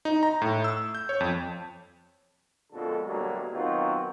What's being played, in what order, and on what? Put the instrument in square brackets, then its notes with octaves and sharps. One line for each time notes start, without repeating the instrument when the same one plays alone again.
[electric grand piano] D#4
A#5
A2
E6
G6
C#5
F2
[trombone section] A#1 F2 B2 D3 G#3 A4
G2 B2 D3 F#3 A3 A#3
B2 D#3 F#3 C4 F4 F#4